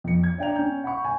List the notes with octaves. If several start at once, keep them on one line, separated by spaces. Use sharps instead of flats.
F2 C#7
G#6
D4 D5 G5 A#5 F7
C#4 C#5 G6
F#5 B5 C#6
G#5